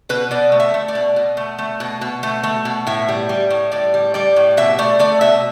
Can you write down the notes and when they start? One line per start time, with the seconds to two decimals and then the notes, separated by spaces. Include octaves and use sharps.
0.09 B2 B4
0.31 B2 D5
0.52 A3
0.60 E5
0.74 A3
0.88 D5
0.95 B2
1.16 B2
1.37 A3
1.58 A3
1.80 B2
2.01 B2
2.23 A3
2.43 A3
2.65 B2
2.87 A2 E5
3.08 G3
3.29 G3
3.50 A2
3.72 A2 D5
3.94 G3
4.14 G3 D5
4.36 A2
4.57 B2 E5
4.79 A3 D5
4.99 A3 D5
5.21 B2 E5